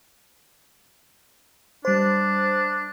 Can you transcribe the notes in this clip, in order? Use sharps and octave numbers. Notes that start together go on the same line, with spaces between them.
G3 D4 C5